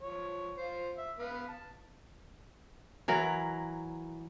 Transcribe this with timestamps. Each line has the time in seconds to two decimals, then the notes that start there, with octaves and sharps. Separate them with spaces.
0.01 F3 C#5
0.56 F4 C5
0.98 E5
1.19 B3 B4 F5
1.48 A5
3.08 E3 F#3 A#4